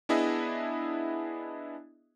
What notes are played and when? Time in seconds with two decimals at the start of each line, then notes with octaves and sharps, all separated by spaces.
0.09 B3 D4 E4 G#4 D#5 E5